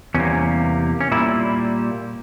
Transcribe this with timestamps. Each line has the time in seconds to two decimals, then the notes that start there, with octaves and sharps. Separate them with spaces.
0.14 E2 C3 G3 A#3 C#4
1.01 C#4
1.12 A#2 G3 A#3 E4